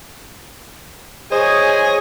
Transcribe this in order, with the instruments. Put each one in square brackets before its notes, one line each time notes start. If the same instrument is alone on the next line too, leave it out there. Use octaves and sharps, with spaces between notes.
[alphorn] G#4 [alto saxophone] C5 [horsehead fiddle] C#5 G#5 [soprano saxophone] D#5